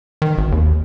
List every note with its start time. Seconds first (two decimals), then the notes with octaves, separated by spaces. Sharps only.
0.22 D#3
0.38 G#1
0.52 D#2